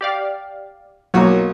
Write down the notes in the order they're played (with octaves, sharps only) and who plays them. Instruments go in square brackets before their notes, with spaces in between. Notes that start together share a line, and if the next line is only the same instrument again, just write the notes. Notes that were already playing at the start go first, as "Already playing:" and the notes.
[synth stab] G4 D5 F5
[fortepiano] B1 F#4 C#5 [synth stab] F#3 A#3